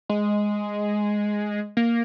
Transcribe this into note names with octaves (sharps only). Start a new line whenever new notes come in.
G#3
A#3